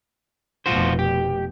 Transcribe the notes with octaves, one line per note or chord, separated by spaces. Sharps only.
F1 B2 F4 F#4 C5
G4